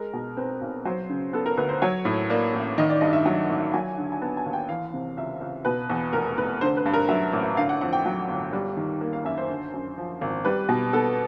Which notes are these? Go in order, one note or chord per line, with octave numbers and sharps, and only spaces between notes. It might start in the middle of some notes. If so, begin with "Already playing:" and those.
Already playing: G#3 A#4
B2
C4 B4
B1
F#3 C5
C#3
B3 A4
A#4
D2 B4
C5
F#3 C#5
A2
A#3 D5
A1
D#3 D#5
D5
G2 D#5
E5
F#3 F#5
A1
F#3 G#5
D3
G#5
B3 A5
G#5
D#2
G5
E3 F5
C3
C#2 E5
C#2
B2 B4
E2
F1 A#4
F1 B4
D3 C5
B4
G2
A#4
F#3 E5
A1
D3 F5
F#5
F2 F#5
G5
F#3
G1
G3
D#3
A#3
F5
F#2 E5
C5
D3
F#2
F3
G#1
G3 B4
B2
B3 A4